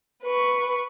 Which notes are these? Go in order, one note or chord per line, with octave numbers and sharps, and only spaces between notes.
B4 C#6